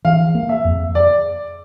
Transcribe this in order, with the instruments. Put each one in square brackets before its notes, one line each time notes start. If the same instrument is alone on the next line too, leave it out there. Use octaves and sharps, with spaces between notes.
[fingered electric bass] E3 [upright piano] F5
[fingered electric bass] A#3
[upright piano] E5
[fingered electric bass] F2
[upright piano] D5